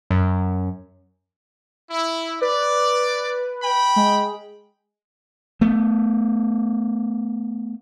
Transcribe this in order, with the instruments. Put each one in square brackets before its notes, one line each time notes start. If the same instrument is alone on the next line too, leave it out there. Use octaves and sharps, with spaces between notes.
[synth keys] F#2
[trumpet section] E4
[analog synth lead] B4 [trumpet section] D5
[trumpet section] G5 B5
[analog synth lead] G#3
[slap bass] A3 B3